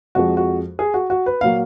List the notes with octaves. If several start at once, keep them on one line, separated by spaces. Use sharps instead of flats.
F2 F3 G#3 F#4
F#4
G#4
F#4
F#4
B4
A#2 F#3 A#3 F5